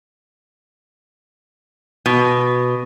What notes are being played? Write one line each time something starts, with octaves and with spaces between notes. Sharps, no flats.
B2